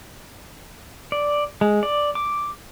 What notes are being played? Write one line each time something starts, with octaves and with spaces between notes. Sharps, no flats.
D5
G#3
D5
D6